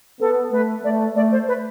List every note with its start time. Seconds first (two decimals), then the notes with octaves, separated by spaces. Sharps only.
0.20 B3 A4
0.52 A3 B4
0.84 A3 D5
1.16 A3 D5
1.32 C5
1.48 B4